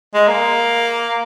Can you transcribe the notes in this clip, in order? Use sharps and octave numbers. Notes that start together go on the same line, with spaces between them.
G#3
A#3